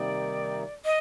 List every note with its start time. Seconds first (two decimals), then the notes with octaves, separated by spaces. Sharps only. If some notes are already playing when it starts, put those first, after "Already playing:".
Already playing: C3 D#3 G3 A#3 D#4 D5
0.85 D#5